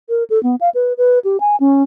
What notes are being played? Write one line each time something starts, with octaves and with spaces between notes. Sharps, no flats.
A#4
A4
B3
F5
B4
B4
G4
G#5
C#4